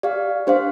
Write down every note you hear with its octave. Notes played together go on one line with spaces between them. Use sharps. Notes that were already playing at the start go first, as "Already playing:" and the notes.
G4 D5 F5
D4 G4 C5 F5